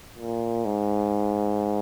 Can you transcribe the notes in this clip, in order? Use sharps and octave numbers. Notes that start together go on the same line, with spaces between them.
A#2
G#2